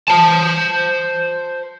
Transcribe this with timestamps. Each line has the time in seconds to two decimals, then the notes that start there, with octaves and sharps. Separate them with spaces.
0.09 C5 A5